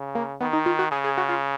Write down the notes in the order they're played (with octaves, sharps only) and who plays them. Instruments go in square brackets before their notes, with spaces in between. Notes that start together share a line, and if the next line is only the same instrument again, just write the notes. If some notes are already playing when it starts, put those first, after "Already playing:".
Already playing: [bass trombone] C#3
[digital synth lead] A#3
[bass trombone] D#3 [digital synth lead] B3
[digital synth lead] D#4
F4
F#4
[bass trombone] C#3 [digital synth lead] G#4
[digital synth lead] G#4
F#4
F4